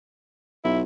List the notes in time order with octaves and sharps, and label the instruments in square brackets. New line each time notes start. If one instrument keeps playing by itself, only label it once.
[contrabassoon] B1 [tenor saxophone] E4